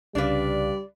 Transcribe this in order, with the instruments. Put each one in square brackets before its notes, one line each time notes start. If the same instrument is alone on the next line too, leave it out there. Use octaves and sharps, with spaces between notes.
[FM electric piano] C2 C#3 F5 [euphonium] G3 [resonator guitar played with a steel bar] D4 B4 [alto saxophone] D5